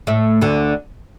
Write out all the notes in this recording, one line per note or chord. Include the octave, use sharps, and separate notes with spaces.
A2 A3
D2 D3